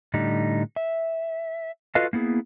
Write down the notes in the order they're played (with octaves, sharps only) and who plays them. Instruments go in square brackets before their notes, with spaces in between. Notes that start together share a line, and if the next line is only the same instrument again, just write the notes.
[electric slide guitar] A2 D3 G3 D#4
E5
F4 F#4 A4 B4 D#5 F5
A#3 B3 E4 G#4